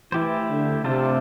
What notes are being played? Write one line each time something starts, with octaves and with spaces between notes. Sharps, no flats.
E3 A3 E4 G4 C5
D3
C3 A3 D4 F4 A4 C5